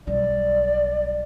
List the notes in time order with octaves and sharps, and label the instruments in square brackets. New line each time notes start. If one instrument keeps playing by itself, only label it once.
[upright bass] B1 G3 [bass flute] D5